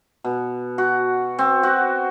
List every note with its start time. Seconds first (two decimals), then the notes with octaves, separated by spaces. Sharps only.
0.24 B2
0.78 F#4
1.38 C4
1.63 F#4